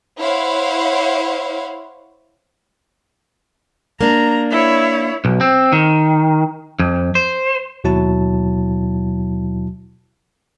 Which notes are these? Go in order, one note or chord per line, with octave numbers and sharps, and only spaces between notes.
E4 C5 C#5 F5 F#5
A#3 D4 A#5
E4 C#5
B1
C4
D#3
F2
C5
D#2 B2 F#3 E4 F#4 A5